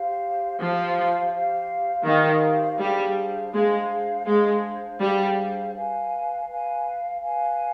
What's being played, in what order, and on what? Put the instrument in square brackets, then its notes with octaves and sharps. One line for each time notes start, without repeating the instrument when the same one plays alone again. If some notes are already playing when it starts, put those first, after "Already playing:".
Already playing: [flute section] G4 C5 F5
[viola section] F3 [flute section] G4 C5 F5
[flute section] G4 C5 F5
[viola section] D#3 [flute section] G4 C5 F5
[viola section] G3 [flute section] D4 G#4 C5 F5
[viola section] G#3 [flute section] D4 G#4 C5 F5
[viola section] G#3 [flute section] D4 G#4 C5 F5
[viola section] G3 [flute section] D4 G#4 C5 F5
[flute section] B4 F5 G#5
B4 F5 G#5
B4 F5 G#5